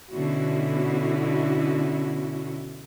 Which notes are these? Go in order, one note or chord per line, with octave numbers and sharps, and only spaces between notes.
B2 D3 C#4 E4 F#4